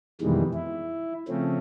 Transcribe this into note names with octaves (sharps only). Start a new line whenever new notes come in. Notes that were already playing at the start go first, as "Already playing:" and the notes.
F2 B2 D#3 E3 G3 G#3
E4
C#3 F3 A3 C4 C#4